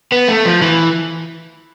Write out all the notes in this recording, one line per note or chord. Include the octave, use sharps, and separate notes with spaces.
B3
A3
F3
E3